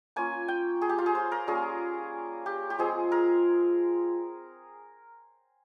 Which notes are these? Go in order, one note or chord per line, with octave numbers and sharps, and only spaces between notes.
A#3 C#4 F4 G#5
G5
G#4
G4
F4
G#4
C5
A#4
G3 A#3 C#4 F4 G#4
G4
G4
F3 G#3 C4 F4 G#4
A#4